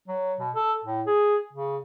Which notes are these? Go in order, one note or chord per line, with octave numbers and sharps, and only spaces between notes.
F#3
B2
A4
A2
G#4
C#3